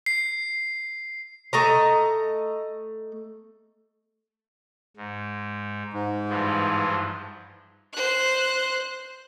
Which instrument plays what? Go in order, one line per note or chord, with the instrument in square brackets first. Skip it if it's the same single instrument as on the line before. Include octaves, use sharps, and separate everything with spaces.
[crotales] C7
[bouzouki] A3 D#5 A#5
[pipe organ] G#2
[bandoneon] G#2
[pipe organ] G2 E3 F3
[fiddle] C5 F#6